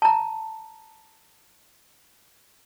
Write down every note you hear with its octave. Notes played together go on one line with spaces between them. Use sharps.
A5 A#5